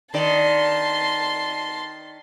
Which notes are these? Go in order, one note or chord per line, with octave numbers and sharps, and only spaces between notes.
D#3 D5 A5 C6